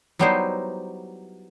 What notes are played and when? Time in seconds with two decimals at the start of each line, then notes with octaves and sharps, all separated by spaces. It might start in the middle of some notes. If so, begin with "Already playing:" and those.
0.19 F#3 G3 B3 D#4 E4 C5